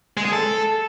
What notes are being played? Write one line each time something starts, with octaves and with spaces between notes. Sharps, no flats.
G#3
G#4
A4